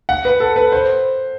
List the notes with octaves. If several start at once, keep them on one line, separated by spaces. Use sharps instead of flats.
F#5
B4
A4
B4
C5